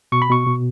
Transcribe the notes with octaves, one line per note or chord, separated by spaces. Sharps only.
B2 C#6
B5
B2 C#6
B2